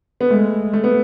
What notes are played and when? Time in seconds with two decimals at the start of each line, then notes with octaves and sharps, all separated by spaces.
0.21 B3
0.30 G#3 A3
0.73 A3
0.84 B3